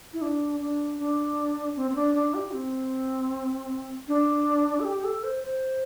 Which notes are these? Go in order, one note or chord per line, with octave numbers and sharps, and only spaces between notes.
E4
D4
D4
D4
C4
C4
D4
D4
G4
C4
D4
A4
G4
A4
C5
C5